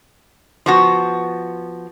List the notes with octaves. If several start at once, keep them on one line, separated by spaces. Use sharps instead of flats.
F3 B3 F#4